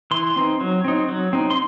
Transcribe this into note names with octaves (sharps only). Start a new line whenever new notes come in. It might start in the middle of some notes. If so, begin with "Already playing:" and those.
E3 C6
C4 D#4
F#3
C4 D#4
F#3
C4 D#4
C6